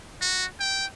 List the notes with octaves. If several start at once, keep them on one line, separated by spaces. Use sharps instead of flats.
F#4
G5